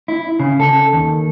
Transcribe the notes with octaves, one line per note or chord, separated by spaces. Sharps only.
E4
C#3
A4
D#2